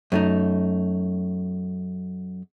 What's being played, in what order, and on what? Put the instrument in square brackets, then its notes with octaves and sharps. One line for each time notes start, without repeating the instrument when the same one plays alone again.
[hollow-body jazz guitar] F#2 A3 D#4